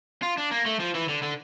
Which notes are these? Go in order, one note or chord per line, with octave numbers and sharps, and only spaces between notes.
F4
D4
A#3
A3
F3
E3
D3
D3